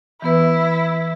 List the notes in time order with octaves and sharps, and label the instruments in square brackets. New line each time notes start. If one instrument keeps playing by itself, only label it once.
[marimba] E3 B3 B4 [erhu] E4